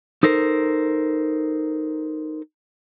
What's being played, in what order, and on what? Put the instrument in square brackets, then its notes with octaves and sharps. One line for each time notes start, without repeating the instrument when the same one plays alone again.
[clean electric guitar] D#4 A4 A#4 C5